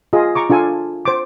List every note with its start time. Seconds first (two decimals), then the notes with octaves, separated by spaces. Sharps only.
0.13 F4 G#4 D#5
0.35 A#5 C#6 D6
0.50 D4 F4 A4 G#5
1.05 C5 D6